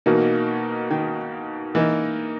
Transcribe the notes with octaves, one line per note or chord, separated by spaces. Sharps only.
B2 E3 A#3 D#4 F#4 A#4
D#3
E3 A#3 D#4 A#4 D#5